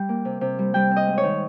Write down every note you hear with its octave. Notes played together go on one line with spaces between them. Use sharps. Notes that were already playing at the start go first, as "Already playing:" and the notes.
Already playing: G3 G5
A#3
C3
C3
G3
G3 G5
C4
D#5
G#2
C#5
D#3